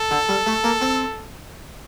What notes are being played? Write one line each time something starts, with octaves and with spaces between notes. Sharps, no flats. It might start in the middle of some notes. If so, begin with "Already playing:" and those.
Already playing: A4
D3
G3
A3
A#3
C4